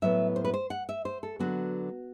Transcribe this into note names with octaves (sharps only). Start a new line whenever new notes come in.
A2 F#3 B3 E5
C5
B4
C5
F#5
E5
C5
A4
D3 F#3 B3 F#4